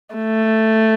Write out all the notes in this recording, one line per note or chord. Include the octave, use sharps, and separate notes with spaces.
A3